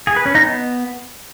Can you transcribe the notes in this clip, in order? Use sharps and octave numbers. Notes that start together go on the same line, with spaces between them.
G#4
B4
C#4
D#4
B3